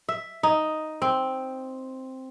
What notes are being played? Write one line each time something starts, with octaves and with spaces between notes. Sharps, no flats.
E5
D#4
C4